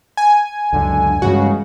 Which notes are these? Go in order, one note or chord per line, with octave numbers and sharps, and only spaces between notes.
G#5
C#2 F#2 D3
G2 C#3 E3 G#3 F#4